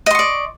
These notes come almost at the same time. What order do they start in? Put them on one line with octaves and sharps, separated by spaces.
D#5 C6 C#6 D5